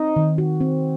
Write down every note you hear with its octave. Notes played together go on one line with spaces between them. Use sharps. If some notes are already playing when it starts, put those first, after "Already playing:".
Already playing: C4 D#4
D#3
F#4
C4